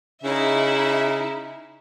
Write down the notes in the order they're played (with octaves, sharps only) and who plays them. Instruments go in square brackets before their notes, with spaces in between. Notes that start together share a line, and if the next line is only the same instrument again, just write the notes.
[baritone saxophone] C#3 [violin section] D#4 E4 E5